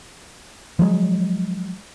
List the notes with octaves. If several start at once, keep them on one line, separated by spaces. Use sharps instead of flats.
F3 F#3 G#3